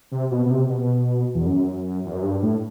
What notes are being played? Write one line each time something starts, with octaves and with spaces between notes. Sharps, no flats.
C3
B2
B2
C3
B2
E2
F#2
E2
F#2
G2
A2